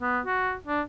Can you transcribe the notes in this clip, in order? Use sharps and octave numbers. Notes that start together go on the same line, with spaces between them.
B3
F#4
D4